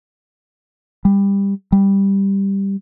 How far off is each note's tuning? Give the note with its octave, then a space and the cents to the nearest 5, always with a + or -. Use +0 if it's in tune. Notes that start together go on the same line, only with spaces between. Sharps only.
G3 +20
G3 +5